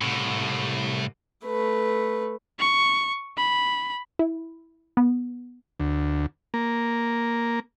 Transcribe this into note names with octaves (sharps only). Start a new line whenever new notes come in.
C2 A2
A3 B4
C#6
B5
E4
B3
D2
A#3